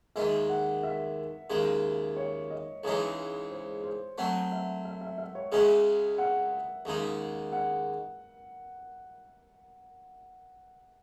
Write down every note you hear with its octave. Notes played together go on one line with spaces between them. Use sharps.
D#2 D#3 G#3 E5
F#5
E5
D#2 C#3 G#3
C#5
D#5
C#2 C#3 E3 G#3 D#4 C#5
C5
C5
F#3 A3 C4 F#5
E5
E5
E5
E5
C#5
C#2 C#3 G#3 C#4 F#4 E5
F#5
D#2 C#3 G#3 D#4
F#5